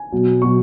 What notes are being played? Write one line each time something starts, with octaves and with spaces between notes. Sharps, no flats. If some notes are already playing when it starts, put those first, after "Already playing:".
Already playing: G#5
B2 F#3
B2 F#3 C#6